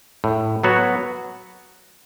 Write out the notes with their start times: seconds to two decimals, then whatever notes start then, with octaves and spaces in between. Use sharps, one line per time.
0.24 A2
0.64 F#3 B3 F#4 C#5